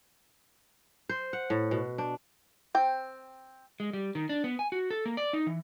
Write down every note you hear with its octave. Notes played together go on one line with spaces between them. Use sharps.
C5
F#5
A2
B2
D4
C4 G5
G#3
G3
D#3
D4
B3
G#5
F#4
A4
A#3
D5
D#4
E3